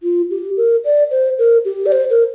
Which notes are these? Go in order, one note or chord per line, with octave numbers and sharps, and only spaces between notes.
F4
G4
A#4
D5
C5
A#4
G4
D5
C5
A#4